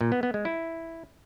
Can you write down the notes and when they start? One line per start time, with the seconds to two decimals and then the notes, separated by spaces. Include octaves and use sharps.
0.01 A#2
0.12 B3
0.23 B3
0.34 G#3
0.45 E4